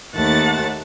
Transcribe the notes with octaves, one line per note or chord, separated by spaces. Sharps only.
D#2 A3 F#5 A5 A6